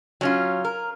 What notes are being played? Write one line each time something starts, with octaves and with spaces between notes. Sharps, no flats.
F#3 C#4 F4
A#4